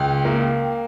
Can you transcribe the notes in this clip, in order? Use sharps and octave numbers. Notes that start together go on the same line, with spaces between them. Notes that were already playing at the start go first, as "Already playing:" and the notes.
Already playing: C#2 G5
A#3